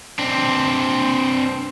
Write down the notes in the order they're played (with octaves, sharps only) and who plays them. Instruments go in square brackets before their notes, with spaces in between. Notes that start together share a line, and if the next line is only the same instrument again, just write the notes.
[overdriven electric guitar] C4 D4